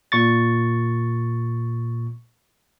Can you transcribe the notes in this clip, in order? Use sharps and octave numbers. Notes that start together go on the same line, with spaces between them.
A#2 C#6 A6